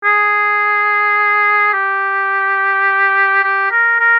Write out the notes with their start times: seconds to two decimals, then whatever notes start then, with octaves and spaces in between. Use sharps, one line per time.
0.04 G#4
1.73 G4
3.44 G4
3.71 A#4
3.99 A#4